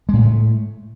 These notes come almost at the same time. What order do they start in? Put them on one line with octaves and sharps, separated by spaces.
G#3 A2 B3 A3